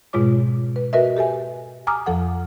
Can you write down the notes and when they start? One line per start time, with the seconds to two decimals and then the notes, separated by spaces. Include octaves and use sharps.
0.13 G#2 B2 G#3 F4 C#5 D6
0.76 B4
0.93 F#4 A#4 B4 D#5 E5
1.17 G4 A4 E5 G#5
1.87 G#5 A#5 D6 D#6 F6
2.06 F2 F3 A4 F#5